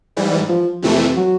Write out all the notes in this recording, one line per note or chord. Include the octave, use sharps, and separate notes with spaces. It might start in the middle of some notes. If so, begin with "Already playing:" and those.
G#2 E3 G3
F3
F2 C3 E3 A3
F#3